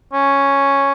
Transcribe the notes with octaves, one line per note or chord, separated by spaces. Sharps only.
C#4